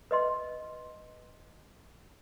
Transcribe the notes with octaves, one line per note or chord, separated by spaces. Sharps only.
B4 D#5 C6